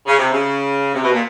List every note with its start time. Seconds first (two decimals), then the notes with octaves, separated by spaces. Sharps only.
0.06 C#3
0.18 C3
0.31 C#3
0.94 C3
1.03 B2
1.13 A#2